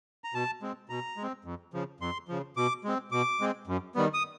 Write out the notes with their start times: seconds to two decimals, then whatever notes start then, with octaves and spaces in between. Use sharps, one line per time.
0.24 A#5
0.34 B2 A5
0.62 G#3 C4
0.89 B2 A#5
1.17 G#3
1.23 C4
1.45 F2
1.73 C#3 F3
2.00 F2 C6
2.28 C#3 F3
2.57 B2 D6
2.84 G#3 C4
3.12 B2 D6
3.41 G#3 C4
3.67 F#2
3.95 D#3 G3 B3
4.14 D#6